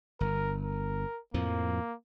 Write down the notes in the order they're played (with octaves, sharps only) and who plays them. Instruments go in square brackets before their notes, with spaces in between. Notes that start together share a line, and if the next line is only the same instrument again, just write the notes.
[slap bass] G1 [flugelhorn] A#4
[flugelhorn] A#4
[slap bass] F2 A2 F3 [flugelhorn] A#3